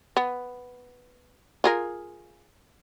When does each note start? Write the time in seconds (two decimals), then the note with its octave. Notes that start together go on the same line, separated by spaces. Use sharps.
0.17 B3
1.64 F4 G#4 A#4